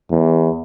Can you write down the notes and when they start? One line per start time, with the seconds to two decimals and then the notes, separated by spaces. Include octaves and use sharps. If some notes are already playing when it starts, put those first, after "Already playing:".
0.11 E2